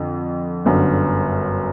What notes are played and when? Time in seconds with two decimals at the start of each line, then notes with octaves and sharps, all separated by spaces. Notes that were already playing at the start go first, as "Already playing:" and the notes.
Already playing: F2 D3
0.65 G1 F#2 D3